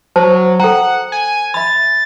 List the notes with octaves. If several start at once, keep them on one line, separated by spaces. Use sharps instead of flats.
F#3 C5 A5
A4 F#5 G5 A#5
G#5
E5 B5 A6